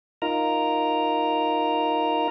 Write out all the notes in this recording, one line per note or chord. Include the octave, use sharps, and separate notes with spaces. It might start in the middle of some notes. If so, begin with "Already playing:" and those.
D#4 F4 A#4 A#5